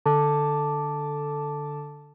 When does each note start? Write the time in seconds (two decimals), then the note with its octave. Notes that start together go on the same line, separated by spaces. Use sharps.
0.06 D3 A4 A5 D6